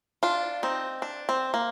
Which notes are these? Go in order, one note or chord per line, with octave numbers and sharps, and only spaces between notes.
D4 F4
C4 D#4
D4
C4
A#3